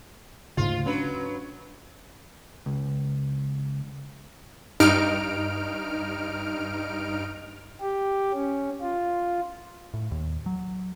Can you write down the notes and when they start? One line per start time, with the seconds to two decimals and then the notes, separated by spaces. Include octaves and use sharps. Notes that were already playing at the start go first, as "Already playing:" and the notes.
0.57 D2 G#2 C#3 F4
0.86 F#3 C#4 D4 B4
2.66 C#2
4.80 G2 D#4 F6 D7
7.81 G4
8.33 C#4
8.81 F4
9.94 A2
10.11 D#2
10.46 F#3